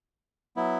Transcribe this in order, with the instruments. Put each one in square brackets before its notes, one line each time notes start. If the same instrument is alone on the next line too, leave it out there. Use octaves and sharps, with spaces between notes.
[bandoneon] F#3 B3 E4